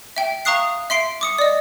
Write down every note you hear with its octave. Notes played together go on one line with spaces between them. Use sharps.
E5 G5
F5 A#5 C#6 D#6 F#6 C7
E5 C6 C7 D7
D6 D#6 C#7
D5 D#5